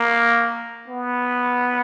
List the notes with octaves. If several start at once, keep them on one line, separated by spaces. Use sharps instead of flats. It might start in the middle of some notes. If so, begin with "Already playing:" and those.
Already playing: A#3
B3